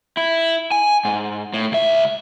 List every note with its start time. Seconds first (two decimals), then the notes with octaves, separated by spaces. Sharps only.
0.17 E4
0.71 G#5
1.05 G#2
1.53 A2
1.72 C#2 E5